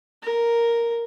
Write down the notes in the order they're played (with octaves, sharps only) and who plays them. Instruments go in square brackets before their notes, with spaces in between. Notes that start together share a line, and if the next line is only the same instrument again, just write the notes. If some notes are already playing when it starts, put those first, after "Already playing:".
[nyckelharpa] A#4